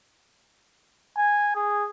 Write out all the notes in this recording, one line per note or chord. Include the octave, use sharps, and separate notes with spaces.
G#5
G#4